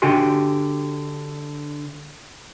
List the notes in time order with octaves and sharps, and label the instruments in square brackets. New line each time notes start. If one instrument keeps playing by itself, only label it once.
[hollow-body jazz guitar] D3 F#4 G4 G#5 C6